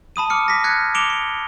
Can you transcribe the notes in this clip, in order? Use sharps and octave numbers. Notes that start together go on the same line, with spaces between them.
A5 B5 D#6 D#7
D6 F6 C#7
D6 A#6 B6
F6 F#6 G#6 C#7
D6 C#7 D7 E7 F7 G7
C#7